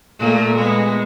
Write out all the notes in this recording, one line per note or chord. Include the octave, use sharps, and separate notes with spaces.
A#2 A3 A#3
G#3 B3